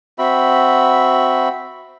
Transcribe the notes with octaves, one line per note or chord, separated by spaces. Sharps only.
C4 F#4 E5 B5